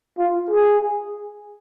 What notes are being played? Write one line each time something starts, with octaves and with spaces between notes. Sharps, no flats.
F4
G#4